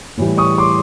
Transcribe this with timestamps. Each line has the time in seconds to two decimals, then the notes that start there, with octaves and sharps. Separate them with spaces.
0.17 A2 E3 G3
0.38 C#6 D#6
0.58 C6 D6